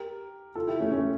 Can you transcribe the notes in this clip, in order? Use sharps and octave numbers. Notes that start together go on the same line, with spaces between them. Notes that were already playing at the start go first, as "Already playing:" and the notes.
Already playing: G4 A#4
F4 A4
E4 G4
A3 C#4
A3 C#4